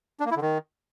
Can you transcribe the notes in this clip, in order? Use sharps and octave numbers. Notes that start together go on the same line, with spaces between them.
D4
A#3
E4
D3
D#3